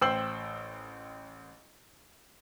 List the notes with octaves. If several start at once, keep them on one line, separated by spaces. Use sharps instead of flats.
A1 C5 G5 E6 C7 F#7